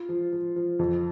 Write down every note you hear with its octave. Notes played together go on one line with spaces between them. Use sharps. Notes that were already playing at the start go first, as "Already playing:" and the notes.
Already playing: F4
F3
F3
F3
F2